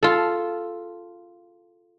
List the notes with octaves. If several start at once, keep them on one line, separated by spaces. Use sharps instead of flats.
F4 A4